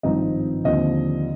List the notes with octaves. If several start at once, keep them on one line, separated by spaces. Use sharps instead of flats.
G#1 G2 F3 C4 D#4 D#5
D#2 D3 F3 C4 D#5